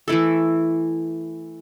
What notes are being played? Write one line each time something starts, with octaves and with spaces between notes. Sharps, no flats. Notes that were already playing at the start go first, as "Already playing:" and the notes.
E3 A3 E4 A4